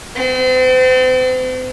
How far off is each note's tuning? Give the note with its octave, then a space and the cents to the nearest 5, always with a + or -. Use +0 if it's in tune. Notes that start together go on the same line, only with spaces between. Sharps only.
C4 -40